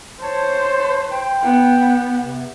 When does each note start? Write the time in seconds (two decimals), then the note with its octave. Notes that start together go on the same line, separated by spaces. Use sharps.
0.22 C5 C#5 A5
1.11 G5
1.43 B3
2.20 C3